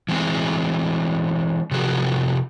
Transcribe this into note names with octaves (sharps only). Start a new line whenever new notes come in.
E3 G#3 C4 G#4
C3 F3 F#4 G#4 A#4